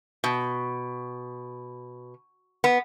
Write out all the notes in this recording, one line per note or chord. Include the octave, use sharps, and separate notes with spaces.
B2
B3